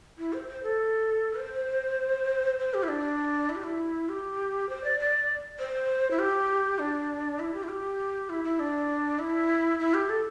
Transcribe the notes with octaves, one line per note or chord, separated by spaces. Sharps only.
E4
C5
C5
A4
C5
C5
G4
E4
D4
E4
G4
E4
G4
C5
D5
D5
C5
E4
G4
D4
E4
G4
E4
G4
E4
E4
D4
E4
E4
G4
A4